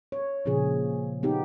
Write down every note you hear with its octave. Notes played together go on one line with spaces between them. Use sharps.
C#5
A#2 C#3 F3 G#4
B3 D#4 G4